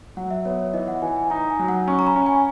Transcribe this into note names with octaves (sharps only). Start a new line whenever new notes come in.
F#3 F#5
E5
B3 C#5
C#5
E3 D#5
F#5
E3 G#5
G#5
D#4 A#5
G#5
F#3
F#5
C#4 C#6
A#5
B5
C#4
G#5